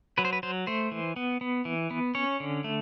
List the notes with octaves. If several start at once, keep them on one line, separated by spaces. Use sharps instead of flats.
F#3 B4
C5
B4
F#3 C5
A3 C5
E3
B3
B3
E3
B3
C#4 C#5
D3
A3